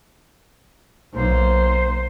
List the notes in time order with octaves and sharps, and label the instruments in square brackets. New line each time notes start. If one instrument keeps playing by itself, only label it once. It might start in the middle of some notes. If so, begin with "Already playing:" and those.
[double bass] B1 A#3 [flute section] C5